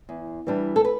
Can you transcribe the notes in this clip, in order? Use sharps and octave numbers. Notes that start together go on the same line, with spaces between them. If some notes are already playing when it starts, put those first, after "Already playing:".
E2
E3 G3 D4
A4
B4